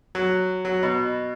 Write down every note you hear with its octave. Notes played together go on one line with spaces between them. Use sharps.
F#3
F#3
B2